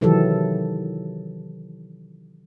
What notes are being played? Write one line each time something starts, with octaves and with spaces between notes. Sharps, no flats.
C3 D#3 E3 F#3 G4 A4